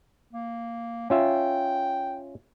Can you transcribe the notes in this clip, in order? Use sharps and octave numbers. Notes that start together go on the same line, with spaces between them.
A#3
C#4 F4 E5 G5